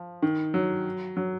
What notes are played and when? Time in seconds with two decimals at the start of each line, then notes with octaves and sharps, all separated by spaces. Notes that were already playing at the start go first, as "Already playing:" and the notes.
Already playing: F3
0.22 D#3
0.54 F#3
1.17 F#3